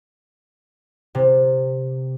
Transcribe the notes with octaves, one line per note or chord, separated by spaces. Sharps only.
C3